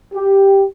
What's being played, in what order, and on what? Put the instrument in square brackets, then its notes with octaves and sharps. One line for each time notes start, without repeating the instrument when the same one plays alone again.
[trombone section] G4